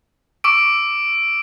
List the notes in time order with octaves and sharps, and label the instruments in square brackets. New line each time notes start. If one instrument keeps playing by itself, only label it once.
[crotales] C#6 D6 E6 D7